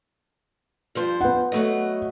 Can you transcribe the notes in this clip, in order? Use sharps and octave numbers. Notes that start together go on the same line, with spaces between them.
G2 F3 C5
B3 F#5
F#3 A3 D#5